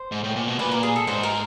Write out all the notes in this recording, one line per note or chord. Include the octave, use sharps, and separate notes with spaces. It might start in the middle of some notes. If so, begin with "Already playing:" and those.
Already playing: C5
G#2
A2
A#2
B2
A#2 B4
A#4
G#4
A4
G#2 C5
A#4